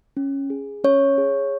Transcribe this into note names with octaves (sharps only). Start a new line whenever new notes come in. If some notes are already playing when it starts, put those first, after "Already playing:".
C#4
G#4
C#4 C#5
G#4